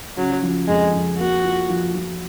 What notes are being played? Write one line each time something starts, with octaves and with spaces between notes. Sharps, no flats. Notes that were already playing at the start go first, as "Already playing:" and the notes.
C#3 F#3
F3
F2 G#3
F2
A#3 F#4
F4
F3
F3